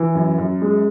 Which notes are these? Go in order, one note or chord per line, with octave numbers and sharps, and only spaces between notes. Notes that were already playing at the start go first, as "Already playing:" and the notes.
Already playing: E3
F#2
F#2
G#3